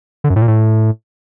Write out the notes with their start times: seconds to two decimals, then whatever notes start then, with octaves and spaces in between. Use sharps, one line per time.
0.24 D3
0.30 F#2
0.36 A2
0.42 A#2
0.48 A2